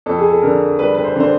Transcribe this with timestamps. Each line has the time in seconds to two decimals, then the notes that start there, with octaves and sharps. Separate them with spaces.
0.06 F2 A4
0.18 G#4
0.30 A4
0.42 D3 A#4
0.79 G3 B4
0.95 B4
1.04 C5
1.16 D3 C5